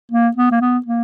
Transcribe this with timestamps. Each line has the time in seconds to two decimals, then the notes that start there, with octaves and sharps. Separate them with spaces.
0.11 A#3
0.36 B3
0.52 A#3
0.61 B3
0.86 A#3